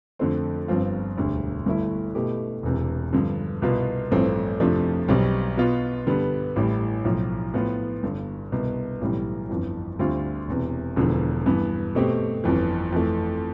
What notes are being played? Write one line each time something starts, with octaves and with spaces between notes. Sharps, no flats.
F2 D3 A3 C4
G1 G2 F3 C4 F4
E1 D2 D3 G3
G1 G2 D3 A3 E4
B2 A3 E4 G4
E1 E2 C3
G2 D3 F3
C2 B2 B3 F4
A1 G2 F3 A3 C4
F2 C3 F3 A3 D4
B1 B2 G3 C4
B2 B3 F4
G2 D3 G3 B3
A1 A2 G3
B1 A2 F3
A2 F3 B3 F4
G1 G2 D3
C2 B2 B3
B1 A2 E3 G3
G1 F2 E3
D2 D3 G3 C4 F4
E1 E2 C3
E1 E2 D3 F3
G2 E3 B3
B2 A3 C4 G4
G1 F2 E3
F2 E3 A3